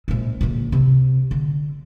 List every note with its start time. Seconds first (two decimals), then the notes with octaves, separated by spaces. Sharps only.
0.08 A#1 G#3
0.41 A#1 D3
0.72 C3 C4
1.31 D3